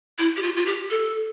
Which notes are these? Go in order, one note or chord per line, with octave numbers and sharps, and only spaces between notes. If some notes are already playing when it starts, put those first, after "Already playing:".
E4
G4
F4
F4
G4
A4